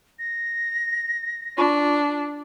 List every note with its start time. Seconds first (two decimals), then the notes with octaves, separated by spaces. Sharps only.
0.19 A#6
1.58 D4 F4 B5 C#6